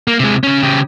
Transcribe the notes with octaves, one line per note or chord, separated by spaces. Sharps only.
A#3
C3 G#3
C#3 C#4
C#3 G4